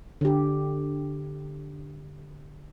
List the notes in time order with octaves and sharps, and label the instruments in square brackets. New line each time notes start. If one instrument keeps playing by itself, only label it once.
[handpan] D3 G4